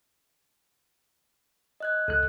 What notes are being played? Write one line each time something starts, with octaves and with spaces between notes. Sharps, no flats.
D#5 F#6 G#6
C#2 A4 F#6